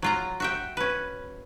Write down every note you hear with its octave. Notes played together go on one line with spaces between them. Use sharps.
F#3 F4 A#5
F#4 E5 G5
C#4 B4